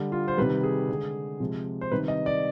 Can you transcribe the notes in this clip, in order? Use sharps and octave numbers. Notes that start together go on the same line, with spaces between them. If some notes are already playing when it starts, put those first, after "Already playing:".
Already playing: D3 G3
F4
C5
C3 D#3 G3 B4
G#4
D3 G#3
C3 F3 G#3
C5
C3 D#3 G3 B4
D#5
D5